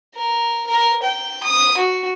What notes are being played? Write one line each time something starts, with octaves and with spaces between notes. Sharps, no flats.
A#4
A#4
G5
D#6
F#4